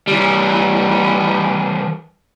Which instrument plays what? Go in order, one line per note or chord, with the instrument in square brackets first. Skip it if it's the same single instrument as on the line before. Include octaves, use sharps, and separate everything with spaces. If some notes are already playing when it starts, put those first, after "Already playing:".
[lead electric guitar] E3 G3